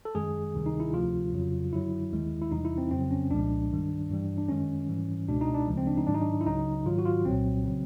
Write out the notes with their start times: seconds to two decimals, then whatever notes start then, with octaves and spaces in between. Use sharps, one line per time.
0.05 A4
0.15 F#2 D#3 G#3 G#4
0.54 D2 C3 D#3 G3
0.66 D#4
0.80 E4
0.94 D2 C3 F3 F4
1.33 F2 C#3 F#3
1.73 F#2 D3 F#3 E4
2.12 D#2 D#3 G#3
2.42 E4
2.52 E2 C3 E3 G3 D#4
2.65 E4
2.78 C4
2.91 F2 C#3 F#3 C4
3.11 C#4
3.31 C2 A#2 F3 G#3 D4
3.70 G2 D#3 G3
4.10 G2 E3 G3
4.38 D4
4.49 F#2 D#3 G#3 C#4
4.89 G#2 E3 G3
5.28 C#2 B2 G#3 D4
5.41 D#4
5.54 D4
5.68 D2 C#3 F3 G#3
5.77 C4
5.87 D4
5.97 D#4
6.07 G#2 D#3 F#3 D4
6.14 D#4
6.21 D4
6.41 E4
6.46 C#2 C#3 F#3 D#4
6.86 G#2 D#3 F#3 F4
6.99 F#4
7.05 F4
7.25 C2 A#2 F#3 C4
7.65 C#3 F#3